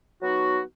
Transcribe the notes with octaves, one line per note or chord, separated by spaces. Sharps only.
F#3 B3 D#4 F#4